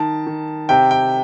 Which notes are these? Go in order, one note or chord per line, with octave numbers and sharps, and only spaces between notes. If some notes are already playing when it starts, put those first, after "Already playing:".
Already playing: D#3 A5
D#3
C3 G5
G5